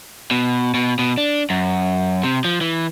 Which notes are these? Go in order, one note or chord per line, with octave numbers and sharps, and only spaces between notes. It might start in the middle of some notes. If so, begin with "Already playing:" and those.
B2
B2
B2
D4
F#2
C3
F3
E3